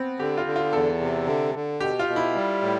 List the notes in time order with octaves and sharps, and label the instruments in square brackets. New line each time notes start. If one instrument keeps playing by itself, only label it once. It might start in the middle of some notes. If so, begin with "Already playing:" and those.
Already playing: [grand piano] B3 C4
[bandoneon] D3 [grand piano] G4
[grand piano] F4
[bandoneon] D3
[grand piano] F4
[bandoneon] E2 [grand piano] A4
[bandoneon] C3
D3
D3
[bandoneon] B2 [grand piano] G4
[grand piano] F4
[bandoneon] B2
[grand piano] E4
[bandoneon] G3
A2